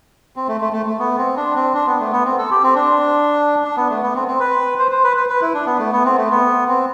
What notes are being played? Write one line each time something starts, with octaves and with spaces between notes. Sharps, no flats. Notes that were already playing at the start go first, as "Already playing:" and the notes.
C4
A3
A3
A3
A3
B3
C4
D4
C4
D4
B3
A3
B3
C4
A4
G4
C4
D4
D4
B3
A3
B3
C4
C4
B4
C5
C5
B4
B4
B4
E4
D4
B3
A3
B3
C4
A3
B3
C4